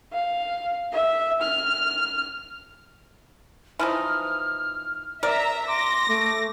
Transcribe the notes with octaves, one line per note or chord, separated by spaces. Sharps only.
F5
E5
F6
E3 F3 D#4 F6
A#4 D5 E5 A#5
C6 D6 A#6
A3 D6